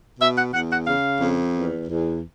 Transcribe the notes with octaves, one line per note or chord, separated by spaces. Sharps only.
B2 E5
F#5
E2 F#5
F#5
C#3 F5
F2
E2
E2